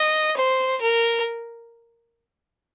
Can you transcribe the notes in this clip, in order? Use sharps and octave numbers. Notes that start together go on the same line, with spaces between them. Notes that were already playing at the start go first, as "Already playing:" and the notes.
Already playing: D#5
C5
A#4